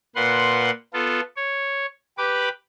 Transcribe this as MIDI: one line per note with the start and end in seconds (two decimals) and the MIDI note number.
0.16 0.70 46
0.16 0.70 71
0.16 0.70 78
0.16 0.70 84
0.94 1.21 59
0.94 1.21 65
0.94 1.21 69
1.36 1.86 73
2.18 2.49 67
2.18 2.49 71
2.18 2.49 83
2.18 2.49 86